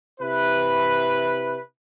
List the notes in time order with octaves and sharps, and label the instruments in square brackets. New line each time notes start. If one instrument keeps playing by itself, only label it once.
[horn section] C3 E4 B4